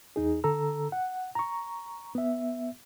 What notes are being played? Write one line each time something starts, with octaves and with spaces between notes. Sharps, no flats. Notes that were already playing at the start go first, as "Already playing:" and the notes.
E2 D#4 G#4
D3 A4 A#5 E6
F#5
A#5 C#6
B3 E5